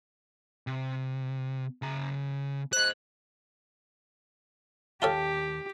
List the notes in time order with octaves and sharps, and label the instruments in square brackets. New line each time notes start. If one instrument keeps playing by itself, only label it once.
[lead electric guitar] C3
C#3 A#5
[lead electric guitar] C5 D#5 [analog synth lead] F#6
[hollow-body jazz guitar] D#2 G5 A5 [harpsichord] F4 A4 C#5 [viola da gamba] G4